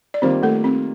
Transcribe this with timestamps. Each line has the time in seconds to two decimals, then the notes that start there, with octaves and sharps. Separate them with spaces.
0.14 D5
0.22 D#3 G3 A#3 C4 F4 C5
0.43 A3 A4
0.64 C4